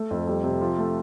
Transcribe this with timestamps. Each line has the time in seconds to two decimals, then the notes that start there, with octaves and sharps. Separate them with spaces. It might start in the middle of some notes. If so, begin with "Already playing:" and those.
Already playing: A3
0.11 F2
0.27 G3
0.44 C3
0.61 F3
0.78 A3